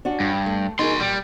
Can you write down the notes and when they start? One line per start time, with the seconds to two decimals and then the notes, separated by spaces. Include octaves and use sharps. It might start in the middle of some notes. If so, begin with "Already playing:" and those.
0.05 C#4 D4 F#4
0.20 G2
0.46 A3
0.79 D#4 F#4 G#4 A#4 C6
1.00 A#2 G3